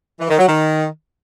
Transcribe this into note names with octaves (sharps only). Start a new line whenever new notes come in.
E3
D#3
F#3
D#3